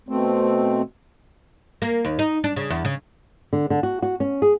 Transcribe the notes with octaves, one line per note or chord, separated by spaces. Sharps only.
B2 A3 C4
A#3
D#2
D#4
D4
C#3
E2
C#3
D3
D3
F#4
F#4
C#4
G#4